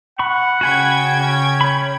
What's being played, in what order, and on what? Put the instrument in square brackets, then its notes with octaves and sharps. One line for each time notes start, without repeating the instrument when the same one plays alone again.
[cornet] F#5 [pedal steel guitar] B5 C#6
[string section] C#3 G5 G#6 [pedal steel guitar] F#4 G#5 B5
[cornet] C#4
[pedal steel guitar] C#5 B5